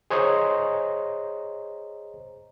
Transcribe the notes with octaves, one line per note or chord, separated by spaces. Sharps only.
G#4 C5 C#5 D#5 A#5